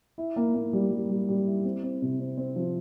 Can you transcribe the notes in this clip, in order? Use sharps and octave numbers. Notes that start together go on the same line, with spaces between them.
E4
A#3
A#3
G3
G3
G3
G3
E4
C4
C4
C3
C4
C4
F3